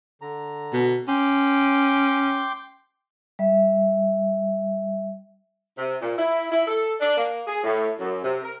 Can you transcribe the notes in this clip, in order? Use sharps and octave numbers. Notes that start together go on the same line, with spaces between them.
D3 A#5
B2
C#4 G5 C6 D6
G3 E5
C3
A#2
E4
E4
A4
D4
A#3
G#4
A2
F#2
C3
A#4